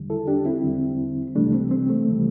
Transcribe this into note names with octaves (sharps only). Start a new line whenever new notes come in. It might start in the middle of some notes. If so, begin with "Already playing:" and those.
Already playing: E2 D3 G3
E4 A4
D4 G4
C4 E4
E2 D3 G3
C2 C3 E3 G3 A3 D4
C4
C4
A3
C3 E3 G3